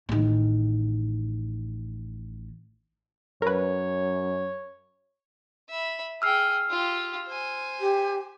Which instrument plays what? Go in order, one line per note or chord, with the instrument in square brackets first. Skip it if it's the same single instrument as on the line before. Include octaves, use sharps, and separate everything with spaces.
[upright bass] A1 D#3
[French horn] F#2 [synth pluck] A#4 B4 [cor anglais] C#5
[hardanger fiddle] E5 B5
[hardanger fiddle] G#4 G5 [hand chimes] E6 F6 C7
[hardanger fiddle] F4 G4
C5 G#5
[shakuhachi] G4